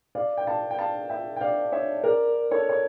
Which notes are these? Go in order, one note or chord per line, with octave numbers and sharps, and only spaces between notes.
D5 F5
G5
F5 A5
G5
F5 A5
E5 G5
G5
D5 F5
C#5 E5
A#4 D5
A4 C#5
C#5